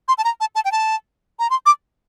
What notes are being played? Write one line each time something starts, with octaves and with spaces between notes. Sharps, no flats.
C6
A5
A#5
A5
A5
G5
A5
A#5
C6
D6